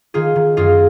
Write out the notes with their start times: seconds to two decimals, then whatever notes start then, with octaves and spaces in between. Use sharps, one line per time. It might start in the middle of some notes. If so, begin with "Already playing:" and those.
0.14 D#3 F4 G#4
0.36 D#3
0.57 F#2 F4 G#4